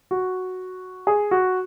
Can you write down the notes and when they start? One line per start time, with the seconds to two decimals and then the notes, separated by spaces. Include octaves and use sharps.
0.11 F#4
1.07 G#4
1.31 F#4